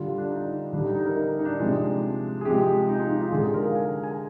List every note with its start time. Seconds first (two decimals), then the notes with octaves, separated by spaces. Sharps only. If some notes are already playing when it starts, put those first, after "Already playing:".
Already playing: D3 G3 F4
0.18 D4
0.30 D#4
0.73 D3 G3 D4
0.84 D#4
0.95 D#4
1.06 A#4
1.16 D#4
1.39 D#4
1.45 D4
1.60 C3 F3 G#3
2.41 G#4
2.45 C3 F3 G#3 G4
2.89 D#4
2.99 F4
3.10 D#4
3.21 F4
3.32 D3 G#3 G#4
3.42 G#4
3.54 A#4
3.65 F5
3.75 G#5
4.03 G#5